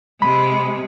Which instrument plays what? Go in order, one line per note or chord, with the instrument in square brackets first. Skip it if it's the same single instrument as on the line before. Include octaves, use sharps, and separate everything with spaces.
[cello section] C3 G#3 [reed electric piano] B5